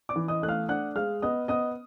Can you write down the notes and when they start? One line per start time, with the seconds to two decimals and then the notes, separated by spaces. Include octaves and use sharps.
0.09 D5 D6
0.16 E3
0.28 D#5 D#6
0.42 A3 F#6
0.48 F5 F6
0.69 D4 F#5 F#6
0.96 G#3 F5 F6
1.22 B3 D#5 D#6
1.48 B3 D#5 D#6